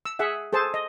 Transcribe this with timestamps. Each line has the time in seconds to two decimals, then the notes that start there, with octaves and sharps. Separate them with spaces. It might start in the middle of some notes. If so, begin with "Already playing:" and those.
0.05 E6
0.19 G#4 E5 F#5
0.53 G#4 A4 C5 A5
0.74 D#5